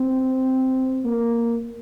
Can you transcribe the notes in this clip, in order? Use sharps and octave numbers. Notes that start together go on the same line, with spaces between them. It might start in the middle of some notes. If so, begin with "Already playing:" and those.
Already playing: C4
A#3